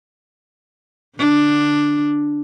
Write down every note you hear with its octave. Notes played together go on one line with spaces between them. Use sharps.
D3 D4